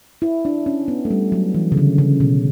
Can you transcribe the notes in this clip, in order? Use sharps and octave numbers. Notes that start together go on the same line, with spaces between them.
E4
D4
C#4
B3
A3
G3
F#3
E3
C#3
D3
C#3
B2